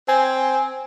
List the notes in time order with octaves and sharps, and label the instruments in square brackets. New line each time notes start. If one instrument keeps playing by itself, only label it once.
[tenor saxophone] C4 [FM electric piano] G#5